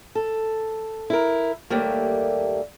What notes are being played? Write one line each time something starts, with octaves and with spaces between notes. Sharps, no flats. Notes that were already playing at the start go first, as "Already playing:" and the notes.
A4
E4 A#4
D#2 G3 A3 A#3